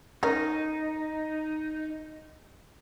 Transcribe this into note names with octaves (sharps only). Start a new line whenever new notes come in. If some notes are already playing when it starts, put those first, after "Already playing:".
A3 C#4 D#4 A#4